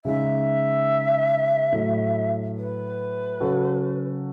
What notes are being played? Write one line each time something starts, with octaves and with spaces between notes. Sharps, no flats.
C#3 G#3 D#4 E5
A2 F#3 A3
B4
C#3 F#3 C#4 F#4 A4